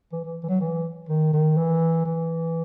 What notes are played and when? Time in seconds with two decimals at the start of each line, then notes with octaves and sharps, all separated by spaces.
0.12 E3
0.24 E3
0.43 E3
0.49 F#3
0.61 E3
1.09 D#3
1.33 D#3
1.57 E3
2.05 E3